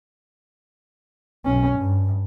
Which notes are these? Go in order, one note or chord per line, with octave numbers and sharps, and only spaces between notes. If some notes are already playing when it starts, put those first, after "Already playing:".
B1 C#4
G2